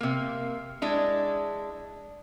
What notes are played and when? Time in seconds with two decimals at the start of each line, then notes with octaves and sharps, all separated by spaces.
0.01 C3 A#3
0.82 G#3 D4 E4